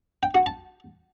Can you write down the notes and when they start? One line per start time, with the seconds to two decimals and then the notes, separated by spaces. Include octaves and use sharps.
0.23 G5
0.35 F#4
0.46 A5